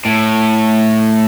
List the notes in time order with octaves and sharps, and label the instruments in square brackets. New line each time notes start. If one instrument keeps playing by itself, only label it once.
[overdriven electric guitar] A2